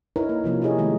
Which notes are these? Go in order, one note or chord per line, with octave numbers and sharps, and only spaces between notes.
D#4 E4 A#4 B4 C#5
A#3
C3 F3 A#3 C#4
D#4 E4 G4 G#4 C#5 D#5
D#3 G#3 A3